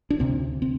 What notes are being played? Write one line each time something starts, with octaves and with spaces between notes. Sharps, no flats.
D4
D2 C3 C4
C4